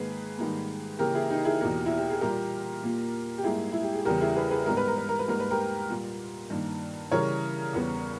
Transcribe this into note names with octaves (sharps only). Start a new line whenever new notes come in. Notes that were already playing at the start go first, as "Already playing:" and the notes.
Already playing: G#2 D#3 A#3 G#4 B4
G#2 D#3 G3 A#3
C#3 E3 A#3 G4 A#4
E4 G#4
D#4 G4
E4 G#4
E2 B2 A#3 G4 A#4
E4
G4
G#4
A#2 G3 A#3 G4 A#4
A#2 A#3
G4
G#2 G3 A#3 E4 G#4
E4
G4
G#4
E2 C#3 G3 B3 G4 A#4
E4 G#4
G#4 B4
G#4 B4
G#2 G3 B3 A#4
B4
A#4
B4
A#4
B4
G#2 G3 A#3 A#4
B4
G4 A#4
A#2 G3 A#3
G2 D#3 A#3
C#3 E3 G3 A#4 C#5
E2 C#3 G3 B3